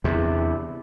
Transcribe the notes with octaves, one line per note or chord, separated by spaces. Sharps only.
E2 C3